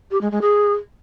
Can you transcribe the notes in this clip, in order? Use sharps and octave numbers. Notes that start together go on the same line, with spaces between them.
G4
G#3
G#3
G#4